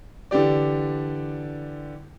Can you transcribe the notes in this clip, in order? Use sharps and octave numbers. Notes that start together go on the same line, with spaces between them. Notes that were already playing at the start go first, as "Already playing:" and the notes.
D3 E3 G4 D5